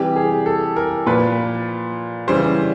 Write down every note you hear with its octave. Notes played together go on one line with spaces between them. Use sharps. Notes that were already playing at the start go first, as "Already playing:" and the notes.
Already playing: C3 E3 G3 G4
G#4
A4
A#4
A#2 F3 B4
C#3 E3 G3 C5